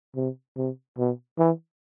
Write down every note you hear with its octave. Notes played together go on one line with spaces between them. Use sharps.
C3
C3
B2
E3